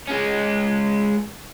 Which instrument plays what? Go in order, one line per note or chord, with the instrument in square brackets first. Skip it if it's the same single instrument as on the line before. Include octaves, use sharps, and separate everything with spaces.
[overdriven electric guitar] G#3 C#4